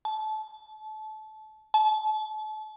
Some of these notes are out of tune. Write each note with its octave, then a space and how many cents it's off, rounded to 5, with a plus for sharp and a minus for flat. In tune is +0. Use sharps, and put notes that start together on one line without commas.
A5 -25
A5 -35